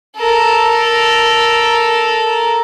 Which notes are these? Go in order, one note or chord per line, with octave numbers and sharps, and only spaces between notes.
A4 A#4